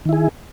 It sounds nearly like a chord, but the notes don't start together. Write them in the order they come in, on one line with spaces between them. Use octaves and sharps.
D#3 E4 G#4